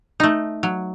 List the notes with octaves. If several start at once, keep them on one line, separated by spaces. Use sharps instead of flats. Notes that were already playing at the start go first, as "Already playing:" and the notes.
A3 D#4
F#3